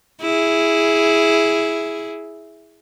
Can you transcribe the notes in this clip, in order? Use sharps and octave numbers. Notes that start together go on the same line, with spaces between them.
E4 G#4